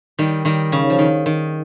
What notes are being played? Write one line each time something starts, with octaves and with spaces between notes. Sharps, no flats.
D#3 G3
D#3 G3
C#3
F3
D#3
D#3